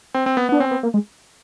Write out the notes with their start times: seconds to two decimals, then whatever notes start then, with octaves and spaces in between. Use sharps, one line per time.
0.14 C4
0.26 C4
0.37 B3
0.49 B3
0.52 D4
0.60 C4 C#4
0.71 B3
0.83 A#3
0.94 G#3